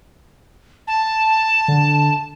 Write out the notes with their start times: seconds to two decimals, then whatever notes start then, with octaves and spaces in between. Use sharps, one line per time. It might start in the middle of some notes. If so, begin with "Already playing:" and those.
0.87 A5
1.68 D3